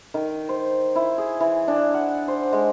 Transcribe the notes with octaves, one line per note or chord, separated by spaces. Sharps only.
D#3
C5
E4
G#4
E3
D4
F#5
C5
G#3